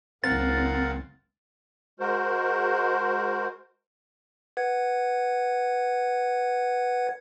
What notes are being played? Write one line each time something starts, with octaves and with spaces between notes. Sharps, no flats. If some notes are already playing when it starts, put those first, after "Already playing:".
F#1 C#2 C4 A#4 F5 F#5 A6
G#3 F#4 A#4 C5
B4 F#5 G#6